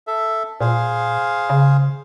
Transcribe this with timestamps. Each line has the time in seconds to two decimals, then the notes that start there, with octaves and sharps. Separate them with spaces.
0.07 A4 E5
0.61 A#2 G#4 C5 F5
1.50 C#3